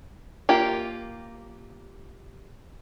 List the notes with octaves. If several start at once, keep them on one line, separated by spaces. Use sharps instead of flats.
A#3 F4 G4